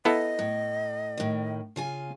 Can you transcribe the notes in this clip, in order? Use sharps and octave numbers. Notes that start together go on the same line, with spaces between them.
B3 E4 A4 D#5
A2
A2 D#3
C#3 F4 G#5